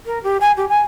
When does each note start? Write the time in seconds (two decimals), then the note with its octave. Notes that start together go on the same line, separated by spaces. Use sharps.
0.06 A#4
0.23 G4
0.41 G#5
0.57 G4
0.69 G#5